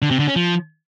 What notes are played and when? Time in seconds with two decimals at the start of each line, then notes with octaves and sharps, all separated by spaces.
0.02 D3
0.11 C3
0.19 D3
0.28 C#4
0.36 F3